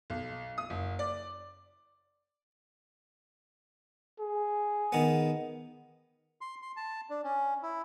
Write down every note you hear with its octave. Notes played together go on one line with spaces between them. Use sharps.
B1
D#6
F#1
D5
G#4
D#3 B3
C6
C6
A5
D4
C#4
E4